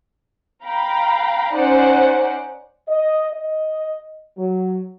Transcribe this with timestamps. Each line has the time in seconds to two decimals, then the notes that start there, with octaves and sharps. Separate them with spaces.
0.64 F5 G5 A#5 B5
1.55 C#4 D#4 C5 D5 F#5
2.89 D#5
3.33 D#5
4.38 F#3